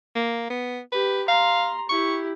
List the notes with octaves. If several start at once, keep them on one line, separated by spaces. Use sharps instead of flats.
A#3
B3
G4 B4
F5 A#5 C6
E4 G4 C#6